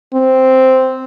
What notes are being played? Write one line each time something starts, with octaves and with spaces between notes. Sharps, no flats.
C4